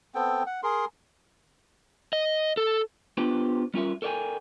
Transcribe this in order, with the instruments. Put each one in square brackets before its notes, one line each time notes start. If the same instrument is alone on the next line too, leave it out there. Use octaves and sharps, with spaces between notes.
[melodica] B3 C4 A4 G5
F#5
G#4 A#4 C6
[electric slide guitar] D#5
A4
[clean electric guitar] B3 D4 F4 G4 B4 C5
G3 C#4 F4 A#4 E5
A4 A#4 D5 D#5 G5 G#5